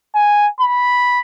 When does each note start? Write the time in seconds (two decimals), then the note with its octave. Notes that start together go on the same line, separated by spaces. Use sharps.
0.15 G#5
0.60 B5